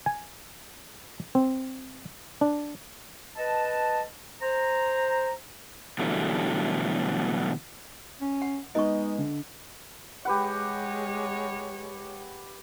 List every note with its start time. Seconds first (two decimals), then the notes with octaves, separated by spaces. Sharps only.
0.06 G#5
1.35 C4
2.41 D4
3.37 B4 D#5 A5
4.41 C5 A#5
5.99 B2 D3 E3 F#3 G3 A3
8.21 C#4
8.42 F#5
8.75 G#3 B3 D#4 D#5 C#6
9.18 D3
10.25 G#3 G4 B4 C#5 F#5